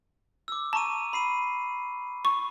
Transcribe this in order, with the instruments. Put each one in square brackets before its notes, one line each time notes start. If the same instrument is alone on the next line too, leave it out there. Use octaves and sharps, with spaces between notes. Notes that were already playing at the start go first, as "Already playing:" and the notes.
[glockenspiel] D6 E6
[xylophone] A5 [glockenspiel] A#5 C#6 D#7
[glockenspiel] B5 C7 D#7
[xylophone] C#6